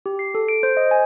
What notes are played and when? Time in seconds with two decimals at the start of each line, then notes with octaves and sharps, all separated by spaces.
0.06 G4
0.19 C7
0.35 A4
0.49 D7
0.63 C5
0.77 D#5
0.91 G#5